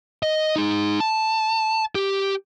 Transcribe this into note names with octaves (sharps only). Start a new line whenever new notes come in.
D#5
D#4 G#4
A5
G4